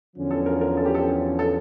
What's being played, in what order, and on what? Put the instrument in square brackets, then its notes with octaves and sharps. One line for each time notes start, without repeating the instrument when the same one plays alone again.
[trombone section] E2 D3 F3 C#4
[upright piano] A4
A#4
A#4
A4
G4
A4
A4